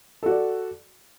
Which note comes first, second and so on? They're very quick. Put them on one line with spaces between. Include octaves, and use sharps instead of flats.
A4 F#4 D5